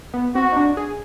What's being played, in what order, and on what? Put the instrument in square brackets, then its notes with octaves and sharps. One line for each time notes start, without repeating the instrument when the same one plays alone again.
[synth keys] B3
[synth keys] C4 [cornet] F#4
[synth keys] D#4
D4
G#4